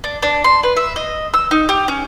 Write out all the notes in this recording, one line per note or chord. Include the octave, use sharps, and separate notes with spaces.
D4
D4
C6
B4
E5
D#5
E6
D#4
G4
C#4